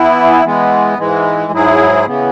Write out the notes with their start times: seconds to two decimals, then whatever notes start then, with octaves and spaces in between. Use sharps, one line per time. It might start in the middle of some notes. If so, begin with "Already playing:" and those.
Already playing: E3 B3 E4
0.45 E3 G#3 B3
0.98 G#2 E3 G#3
1.52 G#2 F#3 E4 G#4
2.06 C#3 E3 B3